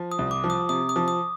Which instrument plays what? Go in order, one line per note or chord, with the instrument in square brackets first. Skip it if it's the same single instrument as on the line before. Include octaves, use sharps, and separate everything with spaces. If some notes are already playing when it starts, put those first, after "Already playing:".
Already playing: [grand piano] F3
[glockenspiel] D#6
[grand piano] C2
[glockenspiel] D6
[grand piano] F3
[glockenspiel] D#6
[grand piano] C3 [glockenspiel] D#6
[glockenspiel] D#6
[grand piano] F3
[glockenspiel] D#6